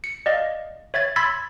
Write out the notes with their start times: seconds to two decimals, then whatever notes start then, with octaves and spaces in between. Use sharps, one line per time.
0.04 C#7
0.26 D5 D#5 F5
0.94 C#5 E5 G#6 A6
1.16 B5 C6 E6 G#6 A6 B6